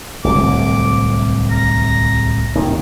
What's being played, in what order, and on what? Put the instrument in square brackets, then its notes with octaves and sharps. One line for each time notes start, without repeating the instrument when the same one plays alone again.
[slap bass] D1 C2 [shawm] D6
[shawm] A#5
[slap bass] D#2 A#2 D#3